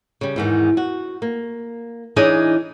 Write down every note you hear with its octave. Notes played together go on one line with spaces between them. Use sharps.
C#3 G3
E2 G#2 D#3
F#4
A#3
E3 D4 D#4 G#4 C#5 D#5